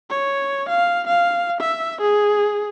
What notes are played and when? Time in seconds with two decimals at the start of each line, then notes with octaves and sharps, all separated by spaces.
0.10 C#5
0.68 F5
1.07 F5
1.60 E5
2.01 G#4